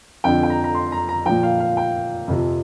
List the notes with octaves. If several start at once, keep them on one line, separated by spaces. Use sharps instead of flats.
F2 D3 F3 G5
G5
A#5
A#5
C6
A#5
A#5
A#2 F3 G5
F5
F5
G5
F2 C3 F3